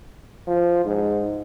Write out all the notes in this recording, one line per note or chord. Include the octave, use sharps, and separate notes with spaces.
F3
G#2